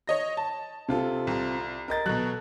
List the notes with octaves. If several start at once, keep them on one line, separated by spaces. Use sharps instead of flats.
C#5 D#5 A#6
A5
C3 F4 A4
C2
A#4 D#5 A6
B2 F#3 A4 F#6